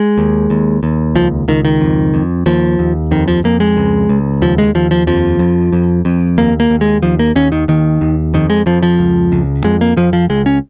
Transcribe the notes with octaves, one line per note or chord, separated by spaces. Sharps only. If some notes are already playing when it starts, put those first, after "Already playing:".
Already playing: G#3
D#2
D#2
D#2
C#2 F3
C#2 D#3
D#3
F2
F2
D#2 F3
D#2
F2 D#3
F3
F2 A#3
G#3
C#2
C#2
D#2 F3
G#3
D#2 F3
F3
F2 F3
F2
F2
F2
D#2 A#3
A#3
D#2
G#3
D#2 F3
A#3
D#2 C#4
D#3
D#2 D#3
D#2
F2 D#3
G#3
F2 F3
F3
C#2
C#2
F2 G#3
A#3
F2 F3
F3
C#2 G#3
C#4